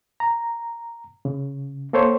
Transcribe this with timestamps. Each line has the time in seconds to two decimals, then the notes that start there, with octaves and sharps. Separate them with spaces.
0.20 A#5
1.25 C#3
1.93 A#3 A4 C5 C#5